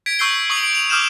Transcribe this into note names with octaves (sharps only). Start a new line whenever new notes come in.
G#6 B6 D7
C#6 E6 G6 C7 G7
C#6 D#6 D7 F#7
D7
F7
D6 D#6 F6 G6 E7